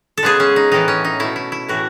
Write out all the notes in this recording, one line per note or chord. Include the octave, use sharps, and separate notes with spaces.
A4
C#3 G#3 B3 G#4
C#4
D#4
A2 E3 B3 D#4
C#4
D#4
B2 A3 E4
E4
E4
A2 E3 A3 F#4